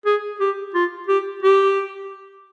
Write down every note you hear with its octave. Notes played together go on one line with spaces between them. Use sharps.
G#4
G4
F4
G4
G4